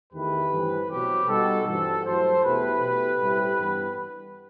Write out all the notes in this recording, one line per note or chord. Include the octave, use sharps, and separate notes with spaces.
E2 D#3 A3 E4 G4 B4
G2 E3 A3 C4
B2 F#3 C4 G4 B4
B2 G3 D#4 F#4 A4
G2 E3 G3 C4 F#4 A4
G2 F#3 A3 E4 A4 C5
E2 B2 A3 E4 G4 B4
B2 A3 E4
A2 G3 C4 E4
G2 E3 B3